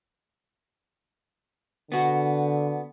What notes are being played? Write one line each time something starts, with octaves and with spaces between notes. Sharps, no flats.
D3 B3 F#4